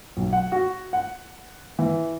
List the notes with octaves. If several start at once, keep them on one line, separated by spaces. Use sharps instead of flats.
B1
F#5
F#4
F#5
E3